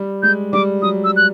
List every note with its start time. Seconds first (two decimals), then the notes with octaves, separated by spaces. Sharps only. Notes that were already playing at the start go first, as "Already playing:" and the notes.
Already playing: G3
0.23 G#3 G6
0.53 G3 D6
0.82 F#3 D#6
1.04 E6
1.16 F#6